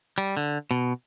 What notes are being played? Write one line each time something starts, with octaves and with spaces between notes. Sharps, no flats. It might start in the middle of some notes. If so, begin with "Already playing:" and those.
G3
D3
B2